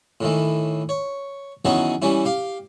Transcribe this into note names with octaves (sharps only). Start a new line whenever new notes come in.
A2 D#3 E3
C#5
D#3 E3 F#3 B3 C#4 G#4
E3 G3 C#4 E4
G4 F5